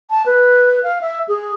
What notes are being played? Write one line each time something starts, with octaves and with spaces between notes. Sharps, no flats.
A5
B4
F5
E5
G#4